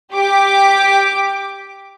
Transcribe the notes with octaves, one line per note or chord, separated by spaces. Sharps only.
G4 D6